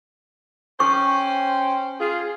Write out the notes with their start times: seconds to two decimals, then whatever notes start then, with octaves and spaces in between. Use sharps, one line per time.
0.80 C#4 C5 G5 C#6
1.99 F4 G#4